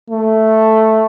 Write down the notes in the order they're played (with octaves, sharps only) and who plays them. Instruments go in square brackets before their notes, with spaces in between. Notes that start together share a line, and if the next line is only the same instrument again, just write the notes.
[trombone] A3